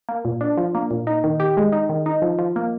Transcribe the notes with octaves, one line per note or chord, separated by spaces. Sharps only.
A#3
A#2
D4
F3
A#3
A#2
D#4
D#3
G4
G#3
D#4
D#3
D#4
F3
F3
A#3